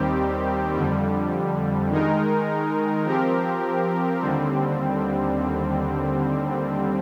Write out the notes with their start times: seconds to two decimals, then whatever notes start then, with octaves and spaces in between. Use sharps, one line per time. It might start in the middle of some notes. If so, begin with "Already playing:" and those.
Already playing: D#2 D#3 G3 C4 G4
0.75 F2 D3 G3
1.90 D#3 G#3 D#4 A#4
3.05 F3 C4 G4 A#4
4.21 D#2 D3 G3 C4